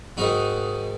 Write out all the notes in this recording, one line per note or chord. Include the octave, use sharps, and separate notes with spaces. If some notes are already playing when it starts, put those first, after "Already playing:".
G#2 D#3 D#4 F#4